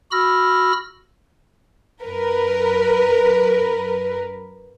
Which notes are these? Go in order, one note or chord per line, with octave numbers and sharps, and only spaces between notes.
F#4 B5 E6 F6 A#6
F#2 A#4 B4